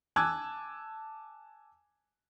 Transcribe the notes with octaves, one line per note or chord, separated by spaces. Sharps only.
G#5 A5 D6 E6 F#6 G#6